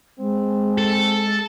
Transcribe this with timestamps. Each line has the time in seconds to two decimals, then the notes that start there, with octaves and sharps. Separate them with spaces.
0.19 G#3 C4
0.78 A4